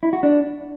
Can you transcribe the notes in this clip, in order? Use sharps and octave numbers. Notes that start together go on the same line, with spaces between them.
E4
F#4
D4